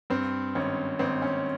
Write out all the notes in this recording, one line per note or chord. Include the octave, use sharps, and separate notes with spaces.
G2 C4
G#1 C#4
G#1 C4
C#4